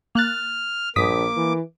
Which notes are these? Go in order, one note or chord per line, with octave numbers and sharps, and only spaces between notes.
A#3 F6 F#6 A6
A#1 G2 A#3 D6 D#6 B6
E3